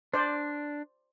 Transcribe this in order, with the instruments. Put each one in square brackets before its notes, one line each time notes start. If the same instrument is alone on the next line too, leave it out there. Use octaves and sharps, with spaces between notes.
[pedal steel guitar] D4 [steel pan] C5 D5